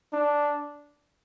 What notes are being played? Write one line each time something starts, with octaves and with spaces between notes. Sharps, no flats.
D4